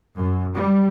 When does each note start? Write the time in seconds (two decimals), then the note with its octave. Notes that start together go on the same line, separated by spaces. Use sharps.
0.18 F#2
0.54 G3